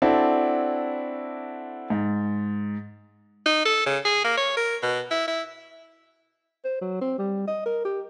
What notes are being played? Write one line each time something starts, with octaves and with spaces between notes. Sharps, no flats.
C4 D4 E4 F#4 A4
G#2
D#4
A4
C#3
G#4
A#3
C#5
A#4
B2
E4
E4
C5
F#3
C4
G3
D#5
A#4
G4